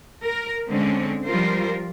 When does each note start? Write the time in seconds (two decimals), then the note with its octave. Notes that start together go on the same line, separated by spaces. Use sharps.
0.23 A#4
0.68 D3 G#3 C4 C#4
1.25 F3 G3 F4 A#4 C5